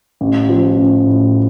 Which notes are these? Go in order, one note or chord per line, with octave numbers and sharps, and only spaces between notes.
A1
F3
A1
A2